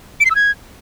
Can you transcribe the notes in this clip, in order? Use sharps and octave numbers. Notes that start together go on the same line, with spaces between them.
D7
C7
E6
G#6